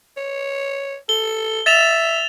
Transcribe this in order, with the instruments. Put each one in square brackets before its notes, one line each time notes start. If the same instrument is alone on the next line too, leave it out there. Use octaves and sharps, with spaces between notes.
[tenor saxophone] C#5
[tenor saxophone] A4 [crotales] G7
[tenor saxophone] E5 [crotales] A6 E7 F7